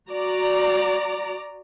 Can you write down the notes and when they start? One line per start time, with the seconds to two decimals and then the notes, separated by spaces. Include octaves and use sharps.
0.10 F#4 D5 A#5